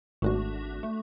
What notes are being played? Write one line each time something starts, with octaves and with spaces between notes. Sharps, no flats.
G#1 A3 D4 F#4
A3